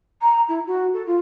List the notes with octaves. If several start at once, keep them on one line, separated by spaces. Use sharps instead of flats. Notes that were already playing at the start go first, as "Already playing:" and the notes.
A#5
E4
F#4
A4
F4